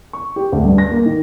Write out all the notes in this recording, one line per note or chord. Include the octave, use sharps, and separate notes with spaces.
C#6
G4
D2
G2
A#6
A#3
D#3